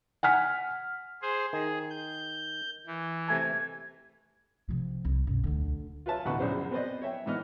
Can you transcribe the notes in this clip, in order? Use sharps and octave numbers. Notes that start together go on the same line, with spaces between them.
F#5 G#5 F6 B6
G#4 C5
D#3 G#4
G6
E3
C3 A3 G#5 G#6
C3 F3
C2
F#2 B2
D2 D3
F4 B4 C#5 E5 A5
A1 D2 B2 B4 F#5 C#6
A#1 F#2 C#3 C5 D5
B3 C4 B4 C5 D5 D#5
C#5 E5 G5
G#2 E3 B3 D#5 F6